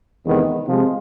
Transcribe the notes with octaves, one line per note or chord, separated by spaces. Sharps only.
E2 C3 D#3 G#3 B3
C3 F3 G#3